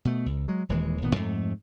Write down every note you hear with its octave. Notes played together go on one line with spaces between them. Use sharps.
B2 A3
C#2
F#3 G#3
D#1 D#2 E3 G#3
G1 A#2 D#3 B3
F2 G#2 A3